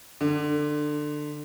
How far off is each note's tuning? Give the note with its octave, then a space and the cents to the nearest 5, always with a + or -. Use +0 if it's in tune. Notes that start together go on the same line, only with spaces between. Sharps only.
D3 +20